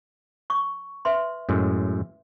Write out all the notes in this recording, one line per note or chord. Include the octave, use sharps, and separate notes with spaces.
C#6
B4 E5 C6
F#2 A2 G#3